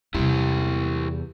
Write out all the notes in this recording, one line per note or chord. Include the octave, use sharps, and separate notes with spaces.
E2 C3 G3 E4 G4